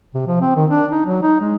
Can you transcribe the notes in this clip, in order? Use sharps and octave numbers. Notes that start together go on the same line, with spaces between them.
C3
F3
C4
D#3
D4
D#4
F#3
D#4
G#3